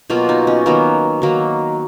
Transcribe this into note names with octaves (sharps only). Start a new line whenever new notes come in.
B2 F#3 A#3 F4
D#4
C#4
D#3 F#3 A#3 B3
D#3 F#3 A#3